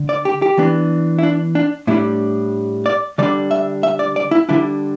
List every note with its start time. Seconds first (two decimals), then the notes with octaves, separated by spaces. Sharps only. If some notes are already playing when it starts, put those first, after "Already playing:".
Already playing: D3
0.09 D5
0.25 G4
0.42 G4
0.58 E3 B3 D4
1.19 E4
1.23 D4
1.55 D4
1.87 A2 G3 D4 E4
2.86 D5
3.18 D3 G3 D4 D5
3.51 E5
3.83 E5
3.99 D5
4.16 D5
4.31 E4
4.49 D3 G3 D4 E4